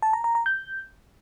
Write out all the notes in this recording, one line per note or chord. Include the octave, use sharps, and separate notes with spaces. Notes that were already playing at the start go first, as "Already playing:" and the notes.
A5
A#5
A#5
A#5
G6